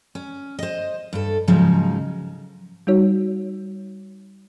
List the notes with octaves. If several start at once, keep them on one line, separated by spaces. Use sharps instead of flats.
C#4
C5 D#5
G2 A4
G#2 C#3 F3 F#3 D#4
G3 D#4 F#4 C#5